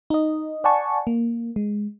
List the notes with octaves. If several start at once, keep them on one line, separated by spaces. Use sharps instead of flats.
D#4 D#5
D5 F#5 G#5 A5 C#6
A#3
G#3